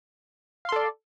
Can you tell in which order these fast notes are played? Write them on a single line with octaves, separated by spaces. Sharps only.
F5 C6 A4 D5